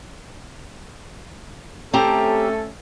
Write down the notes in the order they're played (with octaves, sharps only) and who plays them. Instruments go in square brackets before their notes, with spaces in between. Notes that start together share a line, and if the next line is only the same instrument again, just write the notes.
[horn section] A3 C#4 A4 [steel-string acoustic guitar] C4 G4 A#5